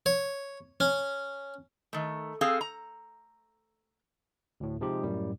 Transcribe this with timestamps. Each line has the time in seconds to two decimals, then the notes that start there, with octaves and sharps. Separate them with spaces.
0.06 C#5
0.80 C#4
1.93 D#3 A3
2.41 C4 G#4 A4 F5
2.61 A#5
4.60 D2 A2
4.81 C3 F3 G#3 D#4 G4
5.03 F#2 A2 G3